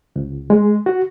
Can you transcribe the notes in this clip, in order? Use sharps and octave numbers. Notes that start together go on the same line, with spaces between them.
C#2
G#3
F#4